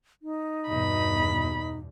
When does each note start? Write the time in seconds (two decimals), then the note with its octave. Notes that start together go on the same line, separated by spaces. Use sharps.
0.22 D#4
0.69 E2 G2 B2 B5